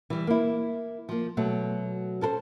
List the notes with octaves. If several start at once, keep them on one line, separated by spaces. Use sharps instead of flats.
E3 G3
A#3 E4
F3 A#3
B2 F#3 A3
C#4 A4 A#4 C5